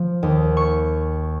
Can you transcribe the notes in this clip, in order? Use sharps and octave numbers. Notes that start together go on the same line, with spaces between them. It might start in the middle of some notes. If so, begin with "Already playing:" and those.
Already playing: F3
D#2
C#6